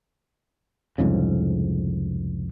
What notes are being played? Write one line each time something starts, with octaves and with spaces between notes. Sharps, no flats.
C2 F2 G#2 C#3